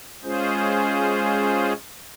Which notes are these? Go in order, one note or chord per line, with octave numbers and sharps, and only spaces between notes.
G#3 C#4 F4 G#4 C5